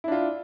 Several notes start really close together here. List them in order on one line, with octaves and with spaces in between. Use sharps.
E4 D4 F4